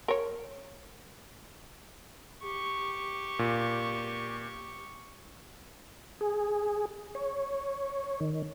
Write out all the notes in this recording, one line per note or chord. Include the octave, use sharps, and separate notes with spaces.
A#4 C#5
G4 C#6
A#2
G#4
C#5
D#3